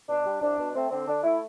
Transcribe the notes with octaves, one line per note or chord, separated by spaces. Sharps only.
B2 D4
G3
C2 D4
B2
A3 C4
D3 C4
D3 D4
A3 E4